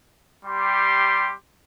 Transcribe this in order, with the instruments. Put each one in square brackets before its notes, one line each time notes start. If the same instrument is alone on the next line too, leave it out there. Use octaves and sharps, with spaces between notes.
[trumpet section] G3 G4 C6